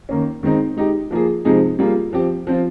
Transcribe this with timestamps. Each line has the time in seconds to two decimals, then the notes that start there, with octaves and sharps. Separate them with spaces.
0.09 D#3 A#3 C#4
0.43 D#3 G#3 C4 D#4
0.77 G#3 D#4 G4
1.11 F3 A#3 F4 G#4
1.45 C3 F3 G#3 D#4 G#4
1.79 G3 A#3 F4 G#4
2.13 F3 C4 G4
2.47 F3 C4 F4